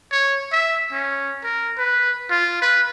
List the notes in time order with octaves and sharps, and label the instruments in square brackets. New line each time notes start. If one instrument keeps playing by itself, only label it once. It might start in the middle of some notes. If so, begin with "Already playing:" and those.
[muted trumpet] C#5
E5
C#4
A#4
B4
F4
B4